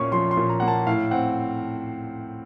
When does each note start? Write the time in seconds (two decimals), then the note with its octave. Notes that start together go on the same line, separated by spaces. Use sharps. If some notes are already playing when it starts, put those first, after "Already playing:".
Already playing: A#2 A#3 C#4 C#6
0.12 F3 C6
0.31 C6
0.37 A#2
0.49 A#5
0.60 A#3 F#5
0.68 A5
0.87 A2 F5
1.11 C4 F#5